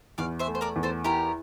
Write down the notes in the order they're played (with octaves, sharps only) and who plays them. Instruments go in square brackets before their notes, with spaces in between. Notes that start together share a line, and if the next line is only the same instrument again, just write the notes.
[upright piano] E2 [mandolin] D5 F5
[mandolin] C5 E5
[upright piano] A3
[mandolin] C5
A#4 D5
[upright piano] E2
[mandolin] A4 C5
[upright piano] E4 [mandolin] G4 A#4